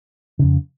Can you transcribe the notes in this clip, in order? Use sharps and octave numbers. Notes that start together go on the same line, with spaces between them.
F2 C#3